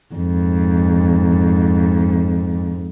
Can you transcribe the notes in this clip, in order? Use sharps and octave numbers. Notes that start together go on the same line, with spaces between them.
F2 G#2